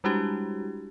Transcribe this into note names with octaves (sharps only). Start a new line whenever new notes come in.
G3 G#3 D4 E4 F#4 G4